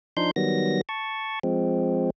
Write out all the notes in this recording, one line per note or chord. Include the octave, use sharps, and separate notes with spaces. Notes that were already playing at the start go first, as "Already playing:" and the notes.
F3 D4 D#4 C6 G6
D#3 F#3 G3 B3 A#6
A5 C#6
F3 G#3 C4